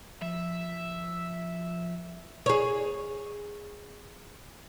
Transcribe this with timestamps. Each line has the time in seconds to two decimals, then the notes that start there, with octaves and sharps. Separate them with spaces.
0.22 F3 E5
2.46 G#4 C#5